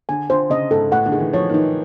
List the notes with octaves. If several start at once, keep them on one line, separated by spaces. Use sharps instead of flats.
D3 G#5
D3 C5
C#3 D#5
G#2 A4
A2 F#5
D3
D#3 G#4
E3
F3 C#5
D#3
E3 D#4